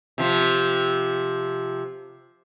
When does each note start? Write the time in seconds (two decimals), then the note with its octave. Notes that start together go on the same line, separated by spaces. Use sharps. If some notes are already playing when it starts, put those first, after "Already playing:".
0.18 C3 F3